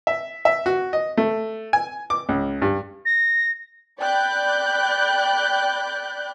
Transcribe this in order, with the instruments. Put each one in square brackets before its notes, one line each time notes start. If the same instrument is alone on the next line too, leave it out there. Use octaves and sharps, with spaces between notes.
[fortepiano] E5
E5
F#4
D#5
A3
G#5
D6
C#2
G2
[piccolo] A#6
[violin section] D5 G5 B5 F#6 G6